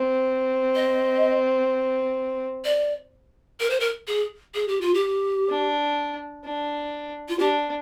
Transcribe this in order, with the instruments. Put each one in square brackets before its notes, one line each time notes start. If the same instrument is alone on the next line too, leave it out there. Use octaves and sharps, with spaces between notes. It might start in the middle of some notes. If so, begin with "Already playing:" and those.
Already playing: [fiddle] C4
[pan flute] D#5
D5
A#4
C5
A#4
G#4
G#4
G4
F4
G4
[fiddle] D4
D4
[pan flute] F4
[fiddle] D4 [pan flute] G4